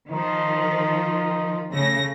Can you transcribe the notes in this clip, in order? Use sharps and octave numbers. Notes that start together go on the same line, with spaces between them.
D#3 F3 D#4
C#3 A3 A#6